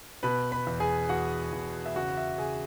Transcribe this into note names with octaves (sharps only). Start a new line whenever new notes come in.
B2 B4 B5
B4 B5
E2
G#4 G#5
E2 F#4 F#5
E2
E5
C#3 F#4 F#5
E5
C#3 G#4 G#5